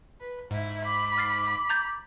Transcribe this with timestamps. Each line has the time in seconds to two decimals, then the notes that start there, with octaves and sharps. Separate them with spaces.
0.21 B4
0.51 G#2 E4
0.85 B5 D6
1.18 F6 A6 C7
1.70 A#5 G6 A6